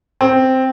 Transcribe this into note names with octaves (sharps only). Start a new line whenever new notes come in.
C4